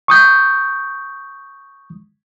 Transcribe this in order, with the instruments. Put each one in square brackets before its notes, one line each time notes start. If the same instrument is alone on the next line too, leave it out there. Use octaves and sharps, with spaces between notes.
[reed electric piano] C#6 D#6 G6